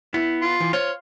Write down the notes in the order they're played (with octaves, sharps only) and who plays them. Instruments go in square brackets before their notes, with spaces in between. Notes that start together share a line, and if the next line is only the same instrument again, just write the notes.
[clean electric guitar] B3 [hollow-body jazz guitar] E4
[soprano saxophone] F4
[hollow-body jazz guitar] E3
[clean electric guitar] F4 [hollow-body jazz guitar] C5 [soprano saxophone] C#5